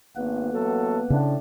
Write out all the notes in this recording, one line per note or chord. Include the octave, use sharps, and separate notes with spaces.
G#1 A#3 B3 B4
A1 F#3 A4
A2 C#3 D4